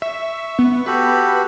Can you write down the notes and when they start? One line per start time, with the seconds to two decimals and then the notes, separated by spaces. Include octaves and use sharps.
0.02 E5 C#6
0.59 B3
0.86 F#4 G4 A4 B4